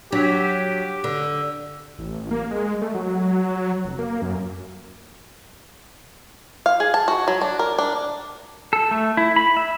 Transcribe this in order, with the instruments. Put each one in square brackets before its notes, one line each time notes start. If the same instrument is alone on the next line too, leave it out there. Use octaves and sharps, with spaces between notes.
[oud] F#3 [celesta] D4 B6 [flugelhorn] G4
[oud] D3
[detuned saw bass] A1
A#3
G#3
A3
F#3
F1
A#3
F#2
[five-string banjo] F5
G#4
A5
F#4
F#3
D4
A#4
D4
[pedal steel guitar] A4
A3
E4
B5
E5